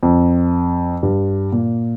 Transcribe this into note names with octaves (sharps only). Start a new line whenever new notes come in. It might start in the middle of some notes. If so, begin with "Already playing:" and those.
F2
G2
A#2